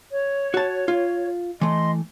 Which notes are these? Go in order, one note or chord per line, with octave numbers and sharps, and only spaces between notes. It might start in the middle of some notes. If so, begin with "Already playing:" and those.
C#5
F#4 A5
F4
E3 A3 D#5 C6